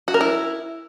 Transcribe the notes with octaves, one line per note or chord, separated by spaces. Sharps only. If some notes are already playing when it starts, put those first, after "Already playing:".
F#4
A#4
E4